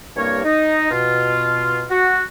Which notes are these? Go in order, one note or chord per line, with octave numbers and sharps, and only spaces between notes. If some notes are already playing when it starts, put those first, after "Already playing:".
C2 G2 A#3 A#4 C#5
D#4
B2 F4
F#4